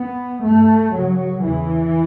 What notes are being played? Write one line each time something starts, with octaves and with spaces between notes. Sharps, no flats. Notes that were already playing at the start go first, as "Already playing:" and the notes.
Already playing: B3
G2 A3
F#2 C#3 F#3
E2 C#3 E3